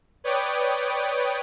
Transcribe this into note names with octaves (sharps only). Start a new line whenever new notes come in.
B4 C#5 D5 G5 D6 D#6